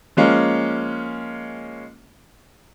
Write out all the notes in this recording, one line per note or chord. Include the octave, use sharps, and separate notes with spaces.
F3 G#3 A#3 C#4